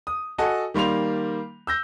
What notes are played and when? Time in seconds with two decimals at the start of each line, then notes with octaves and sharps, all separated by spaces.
0.07 D#6
0.38 F#4 A4 D#5 G#5 A5
0.74 D#3 G3 A#3 C6 F7
1.67 E6 G6 A#6